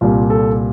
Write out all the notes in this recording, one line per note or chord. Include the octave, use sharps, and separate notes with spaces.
C2 A#2 G3 F4
A4